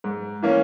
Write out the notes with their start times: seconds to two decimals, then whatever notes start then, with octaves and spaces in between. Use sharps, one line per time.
0.04 G#2
0.43 E3 A#3 C#4